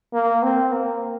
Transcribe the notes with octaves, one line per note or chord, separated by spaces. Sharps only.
A#3
C4
A#3